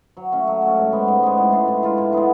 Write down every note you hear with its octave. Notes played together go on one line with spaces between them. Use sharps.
F#3
A3 C#4
F#3
A3 C#4
G#2
G#3 B3
G#2
G#3 B3
A2
G#3 D4 F4
A2
G#3 D4 F4
A2
G#3 B3 D4